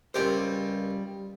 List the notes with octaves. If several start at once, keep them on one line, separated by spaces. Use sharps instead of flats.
C#2 G3 F4 G4 A#4 C5